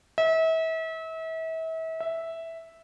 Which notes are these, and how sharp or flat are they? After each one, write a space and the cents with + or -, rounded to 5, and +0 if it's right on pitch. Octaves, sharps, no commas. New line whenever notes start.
E5 -35
E5 -5